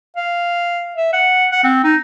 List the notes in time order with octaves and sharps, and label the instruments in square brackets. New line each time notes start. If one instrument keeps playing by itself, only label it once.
[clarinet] F5
E5
F#5
F#5
C4
D#4